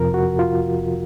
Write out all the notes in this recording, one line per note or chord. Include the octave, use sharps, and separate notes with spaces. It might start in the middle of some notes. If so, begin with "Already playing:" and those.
Already playing: F2 C3 F3 A#4
F#4
F4